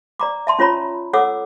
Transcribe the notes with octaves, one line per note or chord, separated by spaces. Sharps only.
D5 A#5 D6
E5 A5 C6
C#4 F4 C#5 A#5 B5
A4 C#5 F#5 D6 E6